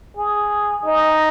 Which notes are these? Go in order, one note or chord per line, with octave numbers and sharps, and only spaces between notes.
G#4
D#4